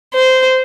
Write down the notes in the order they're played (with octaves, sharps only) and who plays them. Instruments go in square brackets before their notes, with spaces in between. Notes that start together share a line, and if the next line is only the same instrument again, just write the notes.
[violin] C5